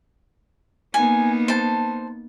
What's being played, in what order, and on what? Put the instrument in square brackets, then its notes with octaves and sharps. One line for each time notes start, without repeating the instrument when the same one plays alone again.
[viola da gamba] A#3 B3 D#4 [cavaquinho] G#5
[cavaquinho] C5 A5